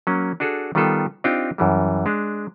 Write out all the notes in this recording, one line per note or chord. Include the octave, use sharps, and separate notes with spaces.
F#3 A#3 C#4
D4 F#4 G#4 A4
D#3 G3 B3 F4 A4
C4 D4 D#4 F4 G4 G5
F#2 E3 G3
G#3 D4